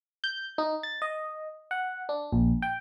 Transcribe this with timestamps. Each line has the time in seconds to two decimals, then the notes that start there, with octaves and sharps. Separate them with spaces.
0.24 G6
0.58 D#4
0.83 A6
1.02 D#5
1.71 F#5
2.09 D4
2.32 A#1
2.62 G5